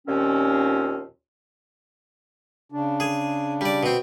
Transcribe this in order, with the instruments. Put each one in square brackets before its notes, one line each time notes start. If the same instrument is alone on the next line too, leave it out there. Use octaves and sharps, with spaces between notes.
[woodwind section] D#2 A#2 D#3 F3 C4 C#4
[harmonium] C#3 D4
[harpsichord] G#4
G3 D5
B2 C4